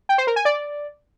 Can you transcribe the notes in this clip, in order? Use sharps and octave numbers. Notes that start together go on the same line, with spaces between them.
G5
C5
A#4
G#5
D5